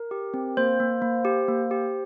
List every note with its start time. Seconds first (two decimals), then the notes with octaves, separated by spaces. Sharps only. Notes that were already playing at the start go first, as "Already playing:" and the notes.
Already playing: A#4
0.11 G4
0.34 C4
0.57 A#3 C5
0.80 A#3
1.02 A#3
1.25 G4
1.48 A#3
1.71 G4